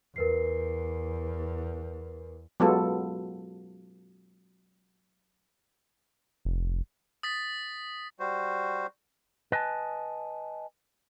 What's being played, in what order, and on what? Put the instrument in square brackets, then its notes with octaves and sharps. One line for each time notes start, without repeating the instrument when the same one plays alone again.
[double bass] E2 [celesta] A#4 B4 C7
[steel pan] F#3 G#3 B3 F4 A4
[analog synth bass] F1
[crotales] D#6 A6 B6
[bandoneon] G3 F#4 C5
[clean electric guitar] B4 D#5 G#5 A5